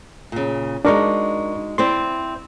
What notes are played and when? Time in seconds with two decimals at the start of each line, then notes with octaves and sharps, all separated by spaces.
0.32 A#2 C#3
0.85 G#3 D4 D#4 F#4 A#4 C#6
1.78 C4 E4 D5 C6